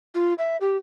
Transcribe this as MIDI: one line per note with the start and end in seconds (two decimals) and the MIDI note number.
0.15 0.34 65
0.38 0.57 76
0.61 0.77 67